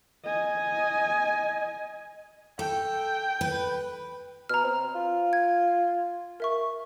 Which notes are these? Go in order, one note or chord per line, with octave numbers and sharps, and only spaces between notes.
D#5 G#5
A4 G5
B4
B2 A#5 F6
C4
F4
G#6
A#4 E5 C#6